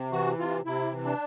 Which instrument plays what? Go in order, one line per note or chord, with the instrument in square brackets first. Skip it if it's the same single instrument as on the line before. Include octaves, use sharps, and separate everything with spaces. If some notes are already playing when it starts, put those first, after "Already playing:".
Already playing: [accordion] C3
E3 F#4
C3 F4
C3 E4
E3
D4